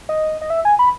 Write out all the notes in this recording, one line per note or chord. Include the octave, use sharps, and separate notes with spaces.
D#5
D#5
E5
G#5
B5